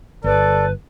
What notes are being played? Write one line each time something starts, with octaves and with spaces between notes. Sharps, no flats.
G1 A4 B4 D5